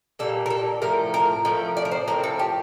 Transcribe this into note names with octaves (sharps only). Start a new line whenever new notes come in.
A#2 G3 A#3 A4
A#4
A4
A2 F3 A3 A#4
A#4
A2 F3 A3 A#4
D5
A#4
C5
A2 F3 C4 A#4
A4
G4